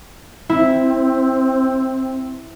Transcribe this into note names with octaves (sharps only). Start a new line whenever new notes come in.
C4 E4